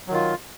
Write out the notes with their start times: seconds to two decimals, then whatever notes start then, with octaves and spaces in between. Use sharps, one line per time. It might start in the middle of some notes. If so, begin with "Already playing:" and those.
0.08 F#3
0.11 D#3
0.14 F4